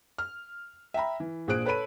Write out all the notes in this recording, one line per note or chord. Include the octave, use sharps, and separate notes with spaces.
F6
E5 G5 A#5 B5
E3
A#1 A#2 G#4 C5 F#6 D7
A4 B4 C#5 B5 D#7